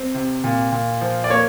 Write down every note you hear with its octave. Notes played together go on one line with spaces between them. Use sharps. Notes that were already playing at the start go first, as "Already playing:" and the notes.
Already playing: C4
C3
A#2
A#2
F3
D5
A#3 C#5